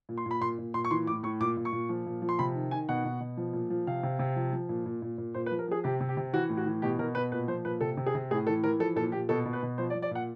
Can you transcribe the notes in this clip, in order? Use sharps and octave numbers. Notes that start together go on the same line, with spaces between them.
A#2
C6
A#2 B5
A#2 C6
A#2
A#2 C6
C#6
E3 C6
A2 D6
A2 C#6
A#2 D6
A#2
C#6
A#2
F3
A#2
F3
C6
C3 B5
D#3
D#3 G#5
B2 F#5
B2
B2
F3
A#2
F3
C3 F5
C3
C3
F3
F3
A#2
A#2
A#2
A#2
A#2 C5
B4
F3
A#4
F3 G#4
C3 G4
C3
G4
C3
E3 F#4
A2
F#4
E3
B2 G4
B2 A#4
B2 B4
A#2 B4
F3 C5
A#2 B4
C3 A4
C3
G#4
C3
A2 G#4
E3 A4
E3 A#4
F3 A4
A#2 A4
A#2 G4
B2 A4
B2
B4
B2
F3 C5
D5
F3
D5
A#2 F#5